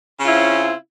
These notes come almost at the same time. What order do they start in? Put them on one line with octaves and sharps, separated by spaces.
C#4 C#3 F4 E4 C4